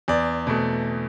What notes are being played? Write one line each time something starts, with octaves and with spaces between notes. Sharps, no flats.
E2 D5
B2 A3